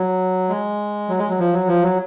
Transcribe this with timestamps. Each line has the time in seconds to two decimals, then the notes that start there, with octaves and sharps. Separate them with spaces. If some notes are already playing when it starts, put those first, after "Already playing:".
Already playing: F#3
0.49 G#3
1.09 F#3
1.19 G#3
1.29 F#3
1.39 F3
1.53 F#3
1.68 F3
1.83 F#3